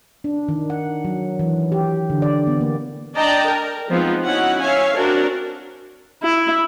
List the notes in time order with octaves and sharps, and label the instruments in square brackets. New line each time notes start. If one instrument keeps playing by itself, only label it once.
[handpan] D4
D#3
F#5
F#3
E3
G4
D3
D5
B3
A#3
[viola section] D4 D5 D#5 G5 A5 A#5
A#4
F3 G#3 B3 C4 D#4 F4
B3 C#4 D#4 E4 F#4 F#5
C#5 E5 F5 G#5
C4 D4 F#4 A#4
[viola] E4